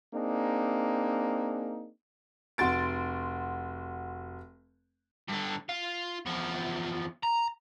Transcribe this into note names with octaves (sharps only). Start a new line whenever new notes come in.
A#3 C4 D4 D#4 G#4
F1 F#4 C6 A6 D7
G2 D3
F4
E2 F3
A#5